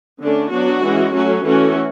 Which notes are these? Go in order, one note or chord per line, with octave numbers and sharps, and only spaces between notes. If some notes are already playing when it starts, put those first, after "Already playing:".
D3 A3 C#4 D4
F#3 B3 D4 F#4
E3 G#3 C#4
F#3 A3 C#4 F#4
E3 A3 C#4 F#4